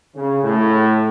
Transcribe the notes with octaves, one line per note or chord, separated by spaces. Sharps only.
C#3
A2